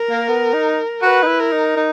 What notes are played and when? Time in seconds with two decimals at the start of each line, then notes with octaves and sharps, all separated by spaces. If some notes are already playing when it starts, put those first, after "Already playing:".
Already playing: A#4
0.10 A#3
0.28 B3
0.54 D#4
1.02 F#4 B4
1.23 D#4
1.27 E4
1.39 A#4
1.52 D#4
1.76 D#4